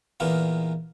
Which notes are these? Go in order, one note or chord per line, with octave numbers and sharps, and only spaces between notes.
E2 A#2 A#3 B3